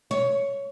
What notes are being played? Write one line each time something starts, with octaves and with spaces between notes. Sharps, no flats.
C#5